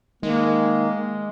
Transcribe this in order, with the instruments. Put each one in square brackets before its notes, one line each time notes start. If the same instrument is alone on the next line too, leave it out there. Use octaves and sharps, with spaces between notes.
[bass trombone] D#3 [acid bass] G#3 [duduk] A#3